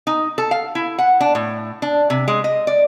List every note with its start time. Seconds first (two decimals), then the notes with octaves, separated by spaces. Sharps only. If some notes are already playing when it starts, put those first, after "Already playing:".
0.07 D#4
0.38 A4
0.51 F5
0.75 E4
0.99 F#5
1.21 D4
1.35 A2
1.82 D4
2.10 C3
2.28 G#3
2.44 D#5
2.67 D5